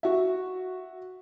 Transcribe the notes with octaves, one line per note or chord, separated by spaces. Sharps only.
F#4 E5